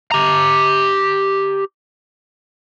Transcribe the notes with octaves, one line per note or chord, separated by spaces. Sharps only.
G4 A#5